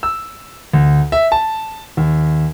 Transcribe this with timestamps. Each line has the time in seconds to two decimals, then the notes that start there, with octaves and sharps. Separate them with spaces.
0.03 E6
0.73 D2
1.12 E5
1.32 A5
1.97 D#2